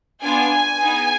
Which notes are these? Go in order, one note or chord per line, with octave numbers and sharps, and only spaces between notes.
B3 D4 F4 G#5
B3 D#4 G#4